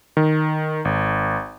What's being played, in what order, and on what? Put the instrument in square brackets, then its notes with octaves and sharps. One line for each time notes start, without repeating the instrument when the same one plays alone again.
[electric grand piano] D#3
G#1